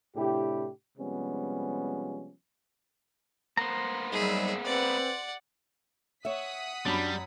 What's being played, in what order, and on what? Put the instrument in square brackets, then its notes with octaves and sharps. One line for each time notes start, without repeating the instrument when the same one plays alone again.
[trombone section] A2 C3 D4 E4 G4
C3 F3 G3 G#3 B3 C#4
[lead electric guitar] A#3 B3 [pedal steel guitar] C5 A#5
[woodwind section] G#2 F#3 G3 [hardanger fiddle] G#4 E5
[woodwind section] C4 B4 [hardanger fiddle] D5 F#5
[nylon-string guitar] C#5 E5 [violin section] F#5 D#6 B6
[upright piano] F#2 B5 [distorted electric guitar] G3 [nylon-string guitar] D4